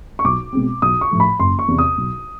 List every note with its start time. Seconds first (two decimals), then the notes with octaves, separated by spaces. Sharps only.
0.19 C#6
0.24 B1 D6
0.53 B2 G#3 C4
0.82 B1 D#6
1.01 C#6
1.11 A2 F3 A3
1.20 B5
1.39 F#1 C6
1.59 C#6
1.68 E2 C3
1.79 D#6
1.98 B1